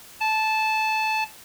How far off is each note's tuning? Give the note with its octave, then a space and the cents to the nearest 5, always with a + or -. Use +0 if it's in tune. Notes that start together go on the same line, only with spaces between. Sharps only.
A5 -15